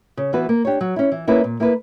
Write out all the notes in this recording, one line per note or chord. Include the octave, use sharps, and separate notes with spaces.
C#3
E3 B3 F#4 B4
A#3
D4 G4 C#5
F#3
C#4 E4
E3
A#3 C#4 E4 B4
A#2
A#3 E4 B4